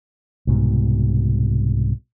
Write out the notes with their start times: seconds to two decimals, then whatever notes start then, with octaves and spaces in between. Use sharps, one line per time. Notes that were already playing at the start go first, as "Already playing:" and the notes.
0.47 C2 G#2 B2